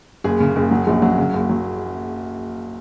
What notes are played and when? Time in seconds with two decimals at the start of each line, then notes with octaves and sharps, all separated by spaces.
0.24 F#1 G#4
0.40 C#3
0.56 F#1
0.71 F#3
0.87 A#1
1.02 F#3
1.18 C#3
1.34 F#1
1.49 F#3